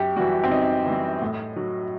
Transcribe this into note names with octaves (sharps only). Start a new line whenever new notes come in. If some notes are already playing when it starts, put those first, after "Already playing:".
Already playing: F#2 G4
E3 G3 F#4
C4
F#2 D#4
E3 G3
A2
F#3